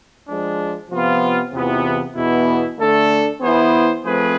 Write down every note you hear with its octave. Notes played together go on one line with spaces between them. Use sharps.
F3 G#3 D4
C3 F3 B3 F4
E2 C3 E3 B3 F4
E2 B2 B3 E4
D3 A3 D4 A4
E3 B3 E4 G#4 C5
F3 A3 C4 G#4 B4